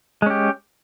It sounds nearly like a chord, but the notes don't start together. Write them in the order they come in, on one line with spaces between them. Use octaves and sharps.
G#3 C#4 G4